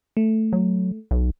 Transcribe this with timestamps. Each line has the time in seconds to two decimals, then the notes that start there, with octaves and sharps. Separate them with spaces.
0.17 A3
0.53 F#3
1.11 B1